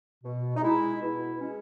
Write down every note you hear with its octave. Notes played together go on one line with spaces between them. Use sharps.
B2
D#4
G#3 E4
B2 E4
G#3 C#4